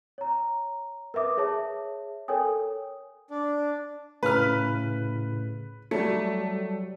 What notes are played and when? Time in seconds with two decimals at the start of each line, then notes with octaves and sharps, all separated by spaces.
0.18 C#5 A#5
1.14 A#4 B4 E5 D6 D#6
1.37 G#4 C#5 E5 A5
2.28 A4 A#4 C#5 G5 G#5 D#6
3.30 D4
4.23 A2 C#3 B4 F6
5.91 F#3 G3 A3